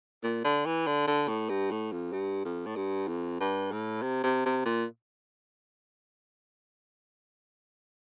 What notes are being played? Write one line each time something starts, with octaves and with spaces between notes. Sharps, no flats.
A#2
D3
E3
D3
D3
A2
G2
A2
F2
G2
F2
A2
G2
F2
G2
A2
C3
C3
C3
A#2